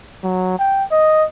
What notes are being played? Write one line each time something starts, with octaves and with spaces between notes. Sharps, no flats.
F#3
G5
D#5